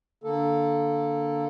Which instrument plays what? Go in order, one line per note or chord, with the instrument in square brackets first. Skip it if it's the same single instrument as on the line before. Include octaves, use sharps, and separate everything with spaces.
[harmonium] D3 A#3 A4